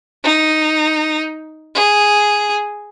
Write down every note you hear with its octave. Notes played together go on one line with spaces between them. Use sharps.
D#4
G#4